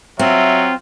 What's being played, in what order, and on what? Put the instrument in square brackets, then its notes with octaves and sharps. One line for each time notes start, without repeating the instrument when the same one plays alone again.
[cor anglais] F#3 [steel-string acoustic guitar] C4 [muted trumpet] F4 [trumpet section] E5